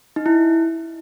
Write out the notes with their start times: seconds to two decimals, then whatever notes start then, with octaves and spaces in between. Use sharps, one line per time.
0.16 D#4
0.26 E4